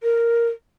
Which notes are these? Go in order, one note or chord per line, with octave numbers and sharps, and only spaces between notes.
A#4